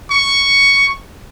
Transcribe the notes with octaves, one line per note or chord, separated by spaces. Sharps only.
C#6